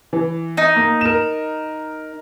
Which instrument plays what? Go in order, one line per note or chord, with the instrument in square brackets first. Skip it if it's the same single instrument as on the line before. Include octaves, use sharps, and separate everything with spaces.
[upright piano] E3
[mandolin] D#4
[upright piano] A#3
A#4 E7